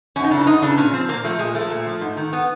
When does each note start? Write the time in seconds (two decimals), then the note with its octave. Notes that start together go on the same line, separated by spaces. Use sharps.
0.16 F#2 C#4
0.24 D#4
0.31 C#3 E3 D4
0.47 F#2 D#4
0.62 C#3 E3 D4
0.78 A#2 C#4
0.93 F3 C4
1.08 A#2 A#3
1.24 F3 A3
1.39 A#2 G#3
1.54 F3 A3
1.70 A#2
1.86 F3
2.01 G#2
2.17 D#3
2.33 B3